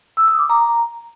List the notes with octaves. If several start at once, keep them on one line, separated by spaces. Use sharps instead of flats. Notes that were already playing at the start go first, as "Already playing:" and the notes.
E6
D#6
D6
A#5